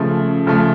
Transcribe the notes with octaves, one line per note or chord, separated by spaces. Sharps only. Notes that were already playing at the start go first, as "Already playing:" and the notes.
Already playing: C#3 F3 A3
C#3 F3 A3